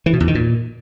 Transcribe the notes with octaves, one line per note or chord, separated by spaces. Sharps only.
E3
B2
E2
D#3
A#2